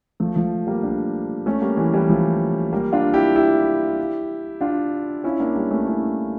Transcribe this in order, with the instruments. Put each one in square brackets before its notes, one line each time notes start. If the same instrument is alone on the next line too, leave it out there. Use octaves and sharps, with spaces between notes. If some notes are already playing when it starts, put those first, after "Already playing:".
[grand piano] F3 A3
F3 A3
G3 A#3
A#3 D4
A3 C#4
G3 A#3
E3 G3
E3 G3
F3 A3
G3 A#3
D4 F4
E4 G4
E4 G4
D4 F4
C#4 E4
A#3 D4
G3 A#3
A3 C#4
C#4 E4